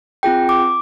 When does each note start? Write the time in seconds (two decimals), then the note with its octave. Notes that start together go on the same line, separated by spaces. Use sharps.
0.23 C4 F4 G#4 G5
0.49 D6